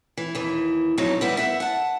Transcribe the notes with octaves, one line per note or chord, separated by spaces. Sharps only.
E3
D#2 E3
F2 G#2 B2 F#3 D#4
G3 B3 E4
E5 F#5
F#5 A5